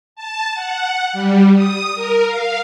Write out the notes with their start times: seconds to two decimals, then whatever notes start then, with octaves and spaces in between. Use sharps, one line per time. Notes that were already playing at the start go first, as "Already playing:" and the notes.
0.16 A5
0.54 F#5
1.13 G3
1.55 D#6
1.95 A#4
2.26 F5